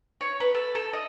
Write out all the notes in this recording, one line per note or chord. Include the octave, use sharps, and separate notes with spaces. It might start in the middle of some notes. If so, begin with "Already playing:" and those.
C#5
B4
A4
A4
D#5